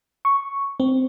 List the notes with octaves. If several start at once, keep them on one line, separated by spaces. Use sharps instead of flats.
C#6
C4